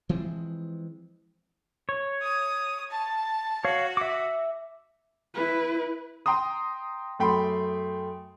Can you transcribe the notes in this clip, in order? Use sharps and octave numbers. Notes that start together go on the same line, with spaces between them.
E3 F3 G#3 C4
C#5
D#6
A5
F#4 C#5 F5
E5 D6
E4 B4
G5 A#5 C6 D#6
F#2 A3 G5 B5 C6